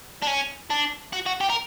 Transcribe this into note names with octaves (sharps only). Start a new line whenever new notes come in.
D4
C#4
D4
F#4
F#4
G4
A#4